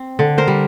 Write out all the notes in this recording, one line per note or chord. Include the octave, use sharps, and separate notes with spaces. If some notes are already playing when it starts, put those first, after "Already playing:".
Already playing: C4
D3
A#4 C5
G3